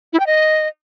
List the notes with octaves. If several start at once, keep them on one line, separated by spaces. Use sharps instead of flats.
E4
G5
D#5